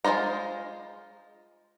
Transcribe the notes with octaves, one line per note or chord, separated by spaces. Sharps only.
G#3 C#4 F4 C5 A#5